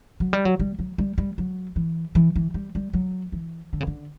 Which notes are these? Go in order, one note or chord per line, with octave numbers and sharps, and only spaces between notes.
F#3
G3
F#3
G3
F#3
G3
G3
F#3
E3
E3
E3
G3
G3
F#3
E3
D3
C#3
D3